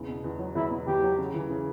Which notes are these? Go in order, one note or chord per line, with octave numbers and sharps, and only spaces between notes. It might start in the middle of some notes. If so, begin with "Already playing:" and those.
Already playing: E2 C#3
B2
E2
F#3
E2 E4
B2
E2 G4
F#3
C#3
E3
C#3